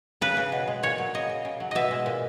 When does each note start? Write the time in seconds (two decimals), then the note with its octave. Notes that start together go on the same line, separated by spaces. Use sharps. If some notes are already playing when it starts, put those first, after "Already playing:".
0.21 C#3 B4
0.37 C#3
0.52 B2
0.68 G#3
0.83 A#2 C#5
0.98 F#3
1.14 C#3 D#5
1.29 C#3
1.45 C#3
1.60 F#3
1.71 B2 D#5 E5
1.91 G#3
2.06 A#2